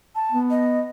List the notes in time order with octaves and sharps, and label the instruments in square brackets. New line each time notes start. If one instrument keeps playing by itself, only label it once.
[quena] A5
[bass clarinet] B3
[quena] D#5